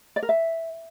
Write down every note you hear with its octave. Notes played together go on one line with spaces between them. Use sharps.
D5
A#4
E5